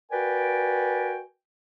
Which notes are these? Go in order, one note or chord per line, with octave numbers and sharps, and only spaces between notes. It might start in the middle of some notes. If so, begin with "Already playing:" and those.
F#4 A#4 B4 D5 G5 G#5